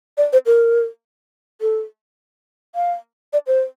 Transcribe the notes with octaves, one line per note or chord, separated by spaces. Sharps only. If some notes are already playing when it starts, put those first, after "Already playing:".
D5
C5
A#4
A4
F5
D5
C5